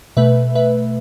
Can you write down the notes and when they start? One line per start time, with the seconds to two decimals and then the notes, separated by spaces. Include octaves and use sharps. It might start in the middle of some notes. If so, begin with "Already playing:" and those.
0.17 B2 A3 B4 E5
0.55 B4 E5